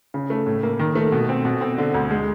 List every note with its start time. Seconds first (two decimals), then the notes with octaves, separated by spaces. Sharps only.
0.14 C#3
0.30 A3
0.46 A2
0.63 A#3
0.79 D#3
0.95 A3
1.12 B2
1.29 C4
1.45 B2
1.61 C4
1.78 D3
1.94 D2
2.10 G#3